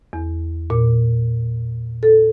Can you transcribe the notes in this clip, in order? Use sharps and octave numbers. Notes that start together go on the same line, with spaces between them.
E2
A#2
A4